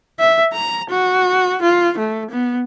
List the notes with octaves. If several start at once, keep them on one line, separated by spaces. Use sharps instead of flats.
E5
A#5
F#4
F4
A3
B3